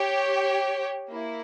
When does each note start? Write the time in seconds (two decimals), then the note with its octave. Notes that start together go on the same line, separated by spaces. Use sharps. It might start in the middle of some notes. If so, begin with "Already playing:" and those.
Already playing: G4 C#5 G5
1.10 A#3 E4